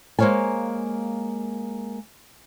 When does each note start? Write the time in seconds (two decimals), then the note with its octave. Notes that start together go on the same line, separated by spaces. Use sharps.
0.19 G#3 A#3 C5 C#5 F5 G#5